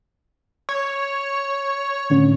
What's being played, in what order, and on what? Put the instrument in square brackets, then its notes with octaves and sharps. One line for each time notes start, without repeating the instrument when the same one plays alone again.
[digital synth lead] C#5
[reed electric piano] A2 D3 C#4